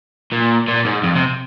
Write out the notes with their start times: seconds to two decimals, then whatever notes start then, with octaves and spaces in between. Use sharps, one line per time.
0.32 A#2
0.68 A#2
0.85 G#2
1.03 F2
1.15 C3